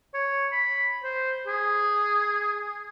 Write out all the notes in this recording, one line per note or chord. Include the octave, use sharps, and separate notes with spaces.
C#5
B5
C5
G#4